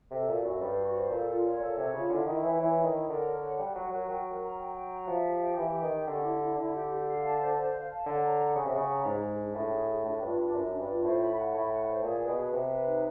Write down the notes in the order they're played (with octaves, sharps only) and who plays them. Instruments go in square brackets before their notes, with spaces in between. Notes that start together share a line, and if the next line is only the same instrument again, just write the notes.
[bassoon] C3 [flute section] A4
[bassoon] A#2 [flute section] F#4
[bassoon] F#2 [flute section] A4
[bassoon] G2 [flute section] C5
[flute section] F#4
C5
[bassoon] A#2 [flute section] A4
[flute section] F4
C#5
[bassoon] A#2 [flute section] A4
[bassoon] C3 [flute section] C#5
[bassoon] C#3 [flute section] F4
[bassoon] D3 [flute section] E4
[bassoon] D#3 [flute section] E4
[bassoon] E3 [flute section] C#5
[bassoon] E3 [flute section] E4
[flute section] E4
[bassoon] D#3
[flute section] C#5
[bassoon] D3 [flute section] A#4
[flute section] C#5
F#5
[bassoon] G3 [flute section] F#5
[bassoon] F#3 [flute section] C#5
[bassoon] F#3 [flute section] A#4
[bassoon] F#3 [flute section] G5
[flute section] A#4
[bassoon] F#3
[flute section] A#5
G5
G5
A#5
[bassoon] F3 [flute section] E5
[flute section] G4
G5
[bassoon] E3 [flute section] G4
[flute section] G5
[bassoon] D#3
[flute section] G4
[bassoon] D3 [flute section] C#4
[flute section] E4
E4
[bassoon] D3 [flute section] E4
[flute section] G4
G4
F5
A5
C5
C5
F5
A5
[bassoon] D3 [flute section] C#5
[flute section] A#5
F#5
[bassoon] C#3 [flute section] F#5
[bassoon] C3
[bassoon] C#3 [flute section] F#5
[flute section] A#5
[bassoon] G#2 [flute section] G#4
[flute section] G#4
D4
[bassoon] A2 [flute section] D4
[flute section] G#4
G#4
[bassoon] A2 [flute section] D4
[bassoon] G2 [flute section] F4
[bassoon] G2 [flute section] D4
[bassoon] F#2 [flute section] D4
[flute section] D4
[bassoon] G2
[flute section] F4
[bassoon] A2 [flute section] C5
[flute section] B5
F#5
[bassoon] A2 [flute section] B5
[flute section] F#5
C5
[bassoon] A#2 [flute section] G#4
[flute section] B4
[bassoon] B2
[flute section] B4
[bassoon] C3 [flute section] B4
[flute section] B4
D#4